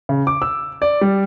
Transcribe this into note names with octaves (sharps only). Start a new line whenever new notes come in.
C#3
D6
E6
D5
G3